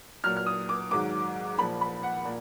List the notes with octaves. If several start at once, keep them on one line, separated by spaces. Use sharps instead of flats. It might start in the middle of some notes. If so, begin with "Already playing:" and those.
A#2 F#3 F6
F6
D#6
D6
G#2 D#3 F#3 D6
A#2 F3 B5
B5
F#5
A#2